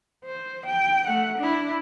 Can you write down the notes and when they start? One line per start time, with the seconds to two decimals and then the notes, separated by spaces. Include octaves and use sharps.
0.25 C5
0.66 G5
1.07 A3 F#5
1.38 D4 E4